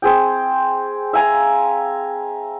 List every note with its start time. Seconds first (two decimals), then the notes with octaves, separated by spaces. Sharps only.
0.02 C4 G#4 G5
1.13 E5 F5 G#5 A#5